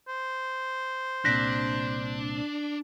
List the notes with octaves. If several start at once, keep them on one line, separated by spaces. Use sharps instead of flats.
C5
C2 A#2 C4 D4 F#6 A#6 B6